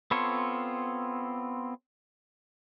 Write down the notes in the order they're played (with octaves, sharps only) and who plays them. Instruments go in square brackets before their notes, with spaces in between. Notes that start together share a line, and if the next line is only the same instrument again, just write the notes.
[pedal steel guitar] B3 C4 F4 A4 C#5